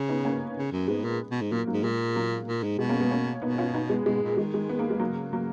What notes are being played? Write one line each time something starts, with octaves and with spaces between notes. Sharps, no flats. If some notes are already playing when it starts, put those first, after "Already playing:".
Already playing: C#3
B3 D#4
A#3 C#4
C#3
F#2
G#2 G#3 B3
A#2
B2
G#2
A#2 F#3 A#3
F#3 A#3
G#2
A#2 G#3
F#3 A#3
A#2
G#2
B2 G#3 B3
A#3 C#4
G#3 B3
A#3 C#4
B2 B3 D#4
C#4 F4
B3 D#4
G#3 B3
B2 G#3
A#2
D#3 G#3
G#3
B3
A#3
G#3
C#3 F#3 A#3
F#3 A#3